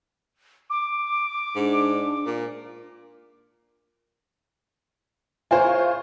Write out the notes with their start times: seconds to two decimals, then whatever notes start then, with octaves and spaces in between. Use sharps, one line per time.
0.70 D6
1.56 G#2 D4
2.26 A#2
5.51 A#3 E4 F4 G#4 C5 C#5